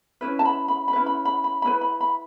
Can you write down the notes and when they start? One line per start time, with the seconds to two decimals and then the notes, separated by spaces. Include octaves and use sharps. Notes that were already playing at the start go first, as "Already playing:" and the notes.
0.21 C#4 E4 B4
0.39 A5
0.45 B5
0.68 B5
0.88 B5
0.93 C#4 E4 B4
1.06 B5
1.25 B5
1.44 B5
1.62 C#4 E4 B4 B5
1.81 B5
2.01 B5